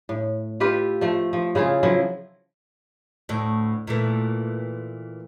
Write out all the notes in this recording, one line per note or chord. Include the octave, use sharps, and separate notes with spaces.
A2
F4 G4 B4 E5
F3 A3
F3
C#3 E4 F4 G#4
F3 F#3 E4
D2 A2
A#2 E3 A3